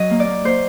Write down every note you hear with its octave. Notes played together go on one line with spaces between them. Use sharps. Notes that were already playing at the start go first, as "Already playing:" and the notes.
Already playing: F#3 D#5
A#3
D5
A#3
A#3 C5